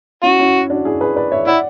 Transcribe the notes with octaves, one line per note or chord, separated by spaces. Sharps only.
C#4 E4 F#4
C#4 E4
D4 F#4
E4 G#4
G#4 B4
B4 D5
C#5 E5
E4 D5 F#5